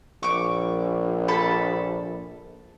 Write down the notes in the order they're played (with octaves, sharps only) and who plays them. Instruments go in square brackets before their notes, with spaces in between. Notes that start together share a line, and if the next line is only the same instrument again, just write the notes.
[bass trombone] A#1 [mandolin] C#6 D6
[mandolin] A4 A5 B5